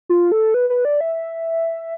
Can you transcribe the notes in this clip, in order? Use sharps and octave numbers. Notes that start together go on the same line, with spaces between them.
F4
A4
B4
B4
D5
E5